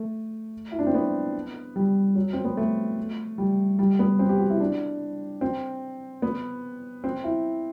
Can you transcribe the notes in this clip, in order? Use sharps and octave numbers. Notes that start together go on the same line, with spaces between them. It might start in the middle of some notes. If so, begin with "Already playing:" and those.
Already playing: A3
E4
D4
C4
B3
G3
F#3
C4
B3
A3
G3
G3
B3
C4
G4
F#4
E4
D4
C4
B3
C4
E4